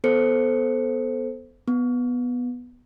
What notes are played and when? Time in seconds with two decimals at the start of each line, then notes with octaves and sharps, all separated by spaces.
0.04 B3 A4 C5 C#7
1.68 B3